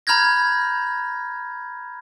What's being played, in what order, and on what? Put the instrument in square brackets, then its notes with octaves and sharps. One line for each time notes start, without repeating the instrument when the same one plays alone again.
[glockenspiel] A#5 B5 F6 G6 G#6 A#6